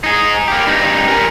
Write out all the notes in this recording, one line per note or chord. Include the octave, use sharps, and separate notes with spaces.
D#4 G#4
A#3 G4
G2 D#4
A#4 G#5